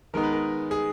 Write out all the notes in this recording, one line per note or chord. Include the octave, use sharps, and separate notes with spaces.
D#3 G#3 B3 D#4 A#4
B4
A#4
G#4